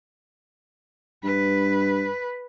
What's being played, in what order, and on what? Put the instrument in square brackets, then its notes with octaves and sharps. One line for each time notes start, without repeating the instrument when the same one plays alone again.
[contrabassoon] G2 [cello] B4